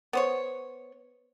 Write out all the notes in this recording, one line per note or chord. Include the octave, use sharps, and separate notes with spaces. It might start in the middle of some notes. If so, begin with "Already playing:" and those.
B3 C5 C#5